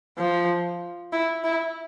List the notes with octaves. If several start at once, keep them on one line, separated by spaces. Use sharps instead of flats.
F3
E4
E4